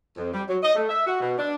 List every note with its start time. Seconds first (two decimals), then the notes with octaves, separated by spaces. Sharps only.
0.17 F2
0.33 G3
0.49 F#3
0.63 D#5
0.75 A3
0.89 E5
1.06 F#4
1.20 B2
1.38 D4